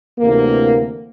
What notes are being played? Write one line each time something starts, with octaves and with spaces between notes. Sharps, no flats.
D2 C3 E3 A#3